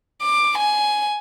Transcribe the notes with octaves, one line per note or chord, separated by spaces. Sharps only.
D6
G#5